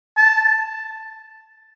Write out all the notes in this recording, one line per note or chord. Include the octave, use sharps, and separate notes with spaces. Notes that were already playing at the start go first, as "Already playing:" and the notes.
A5